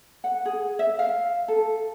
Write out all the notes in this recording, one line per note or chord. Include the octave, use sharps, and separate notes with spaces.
F#5
G#4
E5
F5
A4